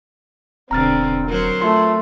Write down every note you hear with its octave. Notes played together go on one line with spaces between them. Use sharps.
E1 B2 D3 C4 A#5 F6 A6
F#3 A#4 C5
A3 F4 C6